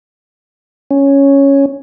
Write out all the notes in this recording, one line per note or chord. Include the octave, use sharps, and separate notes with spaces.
C#4